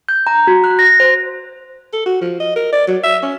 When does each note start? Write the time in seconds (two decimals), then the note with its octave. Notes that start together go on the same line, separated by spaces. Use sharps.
0.09 G6
0.27 A#5
0.47 F#4
0.64 F#6
0.79 A#6
1.00 C5
1.93 A4
2.06 F#4
2.21 F3
2.40 D#5
2.56 A#4
2.73 D5
2.87 F#3
3.03 E5
3.22 C#4